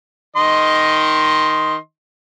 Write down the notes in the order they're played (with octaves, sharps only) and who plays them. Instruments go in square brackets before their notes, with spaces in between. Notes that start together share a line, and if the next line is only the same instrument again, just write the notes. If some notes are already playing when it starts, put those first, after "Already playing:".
[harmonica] D#3 D#5 C6